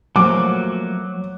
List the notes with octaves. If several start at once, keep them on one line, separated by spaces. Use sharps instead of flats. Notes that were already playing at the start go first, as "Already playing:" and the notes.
F3 F#3 A3 A#3 D6